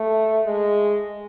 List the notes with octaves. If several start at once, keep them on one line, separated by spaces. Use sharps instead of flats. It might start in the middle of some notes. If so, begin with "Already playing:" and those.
Already playing: A3
G#3